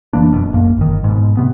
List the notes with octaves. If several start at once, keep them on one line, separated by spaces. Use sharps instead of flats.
F1 E3 A#3 D4
F1 F#2 B2
A#1 F#2 A#3
G1 D#3
G#2 B2
C3 B3